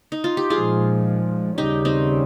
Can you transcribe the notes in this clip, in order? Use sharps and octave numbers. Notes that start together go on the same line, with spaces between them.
D#4
F4
G4
A#2 F3 G#3 F4 G#4
D#2 C#3 G3 C#4 D#4 G4
C4 D#4